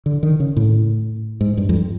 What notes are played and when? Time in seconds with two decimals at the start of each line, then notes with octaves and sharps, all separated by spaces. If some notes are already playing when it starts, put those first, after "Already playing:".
0.06 D3
0.23 D#3
0.40 C#3
0.57 A2
1.41 G#2
1.57 G2
1.69 F2